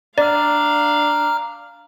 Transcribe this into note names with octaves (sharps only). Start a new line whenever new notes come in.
D4 D5 F5 A#5 F6